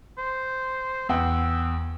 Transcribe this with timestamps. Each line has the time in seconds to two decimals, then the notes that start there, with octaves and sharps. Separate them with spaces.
0.18 C5
1.09 E2 F#5 G5 E6